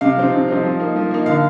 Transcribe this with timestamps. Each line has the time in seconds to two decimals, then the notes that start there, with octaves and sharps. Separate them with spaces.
0.01 C3 F5
0.17 F3 C4 D#4
0.32 C3
0.48 F3 C4 D#4
0.64 F3
0.80 A#3 D#4
0.96 F3
1.11 A#3 D#4
1.26 D3 F5